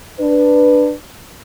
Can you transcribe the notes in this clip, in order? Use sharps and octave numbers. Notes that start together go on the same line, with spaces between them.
D4 B4